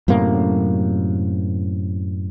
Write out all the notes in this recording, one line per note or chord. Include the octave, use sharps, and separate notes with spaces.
F#2 A2 C3 A#3